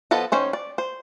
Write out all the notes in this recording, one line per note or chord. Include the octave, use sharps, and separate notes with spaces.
F3 B3 A4 D#5
D#3 C#4 C5 C#5
D5
C5